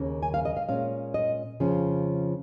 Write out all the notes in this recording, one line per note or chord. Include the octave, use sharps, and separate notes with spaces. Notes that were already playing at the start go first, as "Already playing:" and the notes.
Already playing: D#2 C#3 A#3 C#4
G#5
F5
D#5
F5
A#2 G#3 C#4 F5
D#5
F2 C#3 F3 C#4